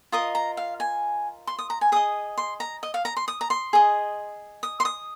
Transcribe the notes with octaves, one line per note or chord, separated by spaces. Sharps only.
F4 A#4 D#5 D#6
A#5
F5
G#5
C6
D#6
A#5
G#5
G#4 D#5 D#6
C6
A#5
D#5
F5
A#5
C6
D#6
A#5
C6
G#4 D#5
D#6
C6
D#6